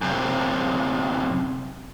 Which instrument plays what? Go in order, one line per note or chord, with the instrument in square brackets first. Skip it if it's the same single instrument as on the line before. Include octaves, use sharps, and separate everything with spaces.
[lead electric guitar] F#2 C3